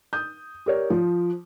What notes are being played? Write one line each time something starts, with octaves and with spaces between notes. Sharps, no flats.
D#6 G6
G4 A#4 C#5 D5
F3